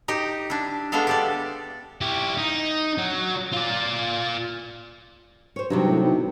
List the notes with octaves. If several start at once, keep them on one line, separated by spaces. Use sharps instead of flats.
D#4 G4 G5
D4 E4
G#3 B3 D4 A4 E5 F5
G4 A4 D5
E4 G4
D#4
F#3
F4 D5
C5 C#5
G2 C3 D#3 F#3
A2
B1